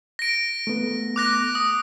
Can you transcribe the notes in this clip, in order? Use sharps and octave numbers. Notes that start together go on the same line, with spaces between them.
A#6 D7
A3 B3
D6 F#6 A#6
D#6